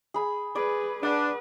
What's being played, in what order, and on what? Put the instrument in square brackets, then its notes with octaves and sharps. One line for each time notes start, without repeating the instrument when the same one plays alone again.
[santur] G#4 B5
[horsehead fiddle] G#4 B4 [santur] D5
[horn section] D4 [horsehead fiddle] B4 [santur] F#5